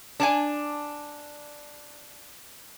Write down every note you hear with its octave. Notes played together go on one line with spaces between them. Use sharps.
D4 D5 G#5